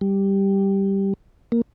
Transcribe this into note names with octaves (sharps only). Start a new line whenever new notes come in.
G3
A#3